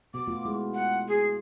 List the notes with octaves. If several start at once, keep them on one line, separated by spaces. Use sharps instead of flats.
B2 B3 D6
A3 B3 F4
G#3 E4
F#5
G#4